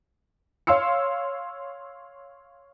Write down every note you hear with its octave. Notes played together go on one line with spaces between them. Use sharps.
C#5 F5 C6 E6 C#7